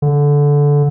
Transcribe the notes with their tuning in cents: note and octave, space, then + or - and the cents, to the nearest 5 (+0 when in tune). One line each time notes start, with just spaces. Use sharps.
D3 -15